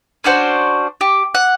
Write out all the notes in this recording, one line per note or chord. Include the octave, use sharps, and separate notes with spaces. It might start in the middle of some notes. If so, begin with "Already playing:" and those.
C#4 D4 F#4 C5
G4
F#5